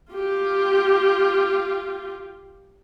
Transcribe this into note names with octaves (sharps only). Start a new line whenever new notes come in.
F4 G4